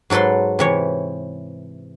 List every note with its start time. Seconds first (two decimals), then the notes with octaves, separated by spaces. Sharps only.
0.10 G#2 F#3 A4 B4 C6
0.59 C3 E3 C#5